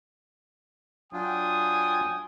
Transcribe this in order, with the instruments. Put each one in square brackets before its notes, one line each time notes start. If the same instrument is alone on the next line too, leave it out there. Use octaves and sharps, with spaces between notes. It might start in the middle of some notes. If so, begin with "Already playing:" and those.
[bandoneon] F#3 D4 F4 [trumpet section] G5 G#5 [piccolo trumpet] D#6